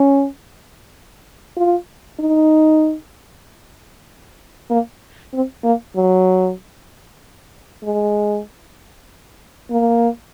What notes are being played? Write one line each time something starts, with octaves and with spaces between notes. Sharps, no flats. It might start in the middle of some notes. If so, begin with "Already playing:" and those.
Already playing: C#4
F4
D#4
A#3
C4
A#3
F#3
G#3
A#3